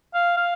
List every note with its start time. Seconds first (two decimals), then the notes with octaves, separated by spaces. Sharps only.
0.14 F5
0.37 F5